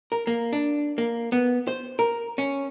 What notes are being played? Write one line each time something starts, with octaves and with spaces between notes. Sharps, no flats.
A#4
A#3
D4
A#3
B3
C5
A#4
C#4